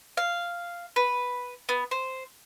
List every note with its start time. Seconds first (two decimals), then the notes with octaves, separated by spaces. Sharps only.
0.17 F5
0.96 B4
1.69 B3
1.91 C5